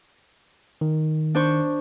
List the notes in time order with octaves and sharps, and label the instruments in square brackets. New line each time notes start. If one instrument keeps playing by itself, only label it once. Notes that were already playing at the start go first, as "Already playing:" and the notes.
[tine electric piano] D#3
[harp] D4 C5 C#6